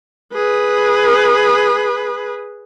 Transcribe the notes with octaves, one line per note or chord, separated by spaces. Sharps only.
G#4 B4